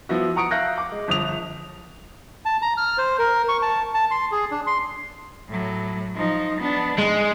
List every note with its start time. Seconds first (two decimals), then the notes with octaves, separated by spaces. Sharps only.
0.09 F3 B3 E4 F#4
0.36 F#5 A#5 C#6 D#6 C#7 D7
0.51 E5 F5 F#6 G6 A#6
0.78 D6
0.92 G#3
1.08 G1 F3 D#6 F7
2.45 A5
2.62 A#5
2.77 F6
2.98 C5
3.19 A#4
3.48 C#6
3.62 A5
3.94 A5
4.11 C6
4.32 G#4
4.51 D4
4.67 C6
5.49 A2 F#3
6.15 F3 D#4
6.60 B3 D4
6.98 G#2 G#3